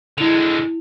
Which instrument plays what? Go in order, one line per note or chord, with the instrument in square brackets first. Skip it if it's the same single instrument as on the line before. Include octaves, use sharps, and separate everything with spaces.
[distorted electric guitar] D3 G#3 [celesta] E4 F7